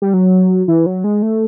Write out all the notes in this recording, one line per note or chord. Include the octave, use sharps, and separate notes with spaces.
G3
F#3
E3
F#3
G#3
A3